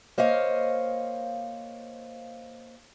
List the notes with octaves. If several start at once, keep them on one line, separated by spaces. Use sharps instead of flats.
A#3 C5 C#5 D#5 F5